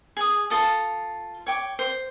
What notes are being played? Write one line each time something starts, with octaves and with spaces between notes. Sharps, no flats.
G#4 D#6
F4 A4 A5 D#6
C#5 G5 D6
C5